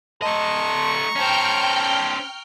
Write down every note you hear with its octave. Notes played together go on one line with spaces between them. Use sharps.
A3 D#5 A5 A#5 C6 C#6
C#4 A4 C5 G5 F6 G6